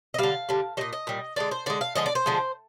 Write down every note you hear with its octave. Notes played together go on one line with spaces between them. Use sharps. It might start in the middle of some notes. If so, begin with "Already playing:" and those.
D#5
D3 G3 F5
D3 G3
A#2 G3 D#5
D#5
A#2 G3
D3 G#3 D5
C5
D3 G#3 D5
F5
D3 F3 G#3 D#5
D5
C5
D3 F3 G#3